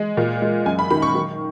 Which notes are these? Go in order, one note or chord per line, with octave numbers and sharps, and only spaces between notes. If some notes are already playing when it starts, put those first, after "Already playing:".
Already playing: G#3
A#2
G#3
F#2 G#5
B5
D#3 B5
C#6
D#3